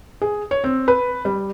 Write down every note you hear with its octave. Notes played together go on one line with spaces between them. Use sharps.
G#4
C#5
C4
B4
G3